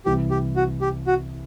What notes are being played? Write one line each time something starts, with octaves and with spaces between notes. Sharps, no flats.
C2 C3 E3 G4
G4
F#4
G4
F#4